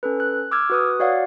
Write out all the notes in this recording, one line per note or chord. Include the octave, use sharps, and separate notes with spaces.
C#4 A4 B4
F#6
D6 E6 F6 G#6
F#4 B4 D#6
F#4 C#5 D5 F5 F#5